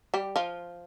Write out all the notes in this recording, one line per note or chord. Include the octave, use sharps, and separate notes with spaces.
G3 G4
F3 F4